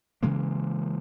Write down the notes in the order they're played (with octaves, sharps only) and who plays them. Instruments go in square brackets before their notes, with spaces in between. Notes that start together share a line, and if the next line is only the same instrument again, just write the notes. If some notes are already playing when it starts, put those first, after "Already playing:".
[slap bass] C#3 E3 G#3 A#3